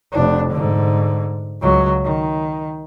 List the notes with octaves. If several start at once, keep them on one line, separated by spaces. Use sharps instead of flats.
F1 D4
G#2 D3
C#2 F#3
D#3